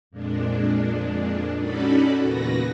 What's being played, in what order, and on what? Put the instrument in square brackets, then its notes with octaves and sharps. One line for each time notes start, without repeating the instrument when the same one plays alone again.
[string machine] F2 A#2 G#3 D4
C#4 D#4 F#4 A4 D5 B5
E2 A#2 C#3 F#4 B4 A#6